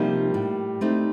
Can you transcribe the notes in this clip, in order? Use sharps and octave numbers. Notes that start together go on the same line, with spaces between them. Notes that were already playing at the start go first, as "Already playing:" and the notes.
Already playing: C3 F3 G3 A#3 D#4
A2
A3 C4 D#4